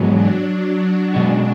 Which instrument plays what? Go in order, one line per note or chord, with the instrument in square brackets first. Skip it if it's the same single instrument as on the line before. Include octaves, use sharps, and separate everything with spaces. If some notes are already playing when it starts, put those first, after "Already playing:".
Already playing: [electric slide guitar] G#2 E3 G#3 B3 [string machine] F#3
[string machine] D4
[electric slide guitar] B2 G#3 C#4 F#4 [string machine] D4